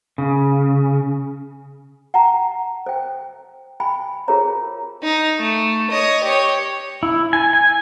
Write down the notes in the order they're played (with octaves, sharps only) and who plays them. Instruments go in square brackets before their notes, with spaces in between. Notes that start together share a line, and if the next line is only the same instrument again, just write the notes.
[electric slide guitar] C#3
[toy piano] F#5 G5 A5 A#5
C5 G5
G5 G#5 B5
F4 G#4 A#4 C5 C#5 A#5
[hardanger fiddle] D#4
A3
C#5 D#5
G4 C#5
[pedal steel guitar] E4
G#5
G#5